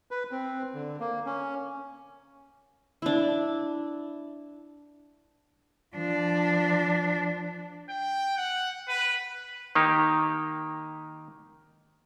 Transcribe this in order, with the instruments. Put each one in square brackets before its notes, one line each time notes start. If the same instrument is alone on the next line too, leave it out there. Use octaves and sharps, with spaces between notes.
[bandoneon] B4
C4
D3
A#3
C#4
[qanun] D4 E4
[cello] F3 D4
[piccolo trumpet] G5
F#5
B4
[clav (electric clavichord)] D#3 A#3 D#4 G4